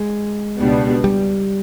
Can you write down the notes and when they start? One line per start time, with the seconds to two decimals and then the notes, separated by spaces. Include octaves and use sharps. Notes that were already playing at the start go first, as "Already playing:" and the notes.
Already playing: G#3
0.59 C#2 B2 G3 B3 D4
1.04 G3